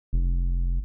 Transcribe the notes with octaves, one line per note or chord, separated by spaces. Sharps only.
F1